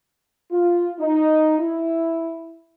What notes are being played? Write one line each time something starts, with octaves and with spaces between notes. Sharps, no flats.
F4
D#4
E4